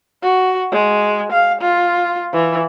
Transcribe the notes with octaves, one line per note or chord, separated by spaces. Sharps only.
F#4
G#3
F5
F4
E3